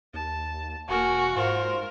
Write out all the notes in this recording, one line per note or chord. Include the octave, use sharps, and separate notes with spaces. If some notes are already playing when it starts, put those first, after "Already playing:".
D#2 A5
E1 A#3 F#4 A#4 G#5
G#2 F4 A#4 C5